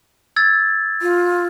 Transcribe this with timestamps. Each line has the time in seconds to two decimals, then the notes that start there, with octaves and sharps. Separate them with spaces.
0.36 E6 G#6 A6
1.02 F4